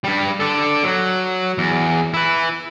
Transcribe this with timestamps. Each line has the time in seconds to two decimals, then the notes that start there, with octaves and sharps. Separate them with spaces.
0.04 G2 G3
0.40 D4 A4
0.84 F#3
1.58 E2
2.14 E4 B4